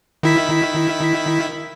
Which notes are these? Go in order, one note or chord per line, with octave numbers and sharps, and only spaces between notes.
D#3 E4 B6